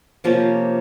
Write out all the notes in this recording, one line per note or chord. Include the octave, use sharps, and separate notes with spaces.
C3 F3 A#3 C#4